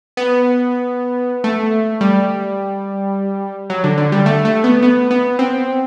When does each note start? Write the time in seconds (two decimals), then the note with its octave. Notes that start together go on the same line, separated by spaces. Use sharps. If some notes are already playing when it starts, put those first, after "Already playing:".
0.17 B3
1.44 A3
2.01 G3
3.70 F#3
3.84 D3
3.98 D3
4.12 G3
4.26 A3
4.45 A3
4.64 B3
4.83 B3
5.11 B3
5.39 C4